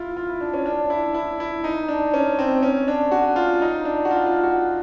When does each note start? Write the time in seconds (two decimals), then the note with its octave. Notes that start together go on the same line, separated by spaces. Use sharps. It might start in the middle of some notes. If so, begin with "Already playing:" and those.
Already playing: E4 F4
0.17 F4
0.29 E4
0.41 D4
0.54 C#4
0.66 D4
0.90 E4
1.14 E4
1.40 E4
1.64 D#4
1.88 D4
2.14 C#4
2.39 C4
2.63 C#4
2.88 D4
3.11 F#4
3.36 F4
3.62 D#4
3.85 D4
4.05 F#4
4.11 F4
4.26 F4
4.43 F#4